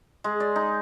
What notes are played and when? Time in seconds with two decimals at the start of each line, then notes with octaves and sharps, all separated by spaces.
0.24 G#3
0.40 D5
0.56 D#4